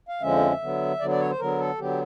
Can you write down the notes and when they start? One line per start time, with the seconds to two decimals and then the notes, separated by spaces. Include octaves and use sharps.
0.09 F5
0.21 F2 D3 F3 G#3 C#4 E5
0.61 D3 F#3 B3
1.00 D3 F#3 B3 D5
1.10 D5
1.20 C#5
1.30 C5
1.39 D3 F#3 B3 A#4
1.59 A4
1.79 D3 F#3 B3 G4